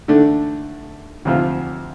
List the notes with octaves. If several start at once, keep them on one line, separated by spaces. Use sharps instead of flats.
D3 A3 D4
D2 C3 F3 C4 F4